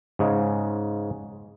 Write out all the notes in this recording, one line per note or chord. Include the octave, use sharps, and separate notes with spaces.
G#2 C#3 G#3